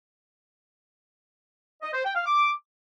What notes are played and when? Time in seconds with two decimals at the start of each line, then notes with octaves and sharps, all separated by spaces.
1.82 D#5
1.93 C5
2.03 G5
2.14 F5
2.25 D6